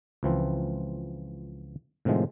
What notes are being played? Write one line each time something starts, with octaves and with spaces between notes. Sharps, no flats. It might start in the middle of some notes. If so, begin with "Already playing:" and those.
C#2 E3 F3 C4
A2 C3 D#3 F3 G#3